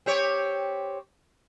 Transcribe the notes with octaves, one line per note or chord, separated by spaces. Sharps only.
C4 G4 C#5